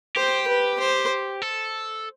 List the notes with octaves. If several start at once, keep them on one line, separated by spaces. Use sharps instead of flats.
G4 C5
B4
C5
A4